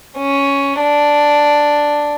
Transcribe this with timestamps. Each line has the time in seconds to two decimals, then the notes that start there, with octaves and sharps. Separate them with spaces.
0.19 C#4
0.81 D4